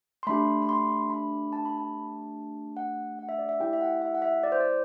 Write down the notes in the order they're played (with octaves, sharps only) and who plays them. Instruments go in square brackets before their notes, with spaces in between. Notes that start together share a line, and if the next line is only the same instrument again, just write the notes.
[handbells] C6
A3 D4 G4 B5
B5
C6
B5
A5
B5
A5
F#5
F#5
E5
D5
E5
A3 E4 G4 G5
E5
F#5
E5
F#5
E5
D5
C5
D5